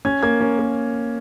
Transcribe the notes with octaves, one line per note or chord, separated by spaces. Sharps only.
C#4 G#6
A#3 G#6
C#4
A#3